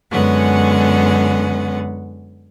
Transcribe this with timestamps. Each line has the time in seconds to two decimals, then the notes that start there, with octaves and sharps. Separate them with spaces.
0.10 F#2 D3 G#3 B3 C#4 F#5